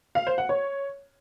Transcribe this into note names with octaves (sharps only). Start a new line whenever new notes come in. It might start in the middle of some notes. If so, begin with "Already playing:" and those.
F5
C5
F#5
C#5